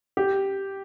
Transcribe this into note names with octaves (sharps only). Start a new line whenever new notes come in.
G4